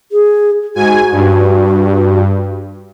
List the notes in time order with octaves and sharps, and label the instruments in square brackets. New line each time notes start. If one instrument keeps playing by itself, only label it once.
[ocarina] G#4
[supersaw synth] G#2 G#5 [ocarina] F#4
[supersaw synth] G2